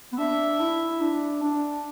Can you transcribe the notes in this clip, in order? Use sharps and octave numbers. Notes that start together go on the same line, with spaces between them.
B3
D4 E5
E4
D4
D4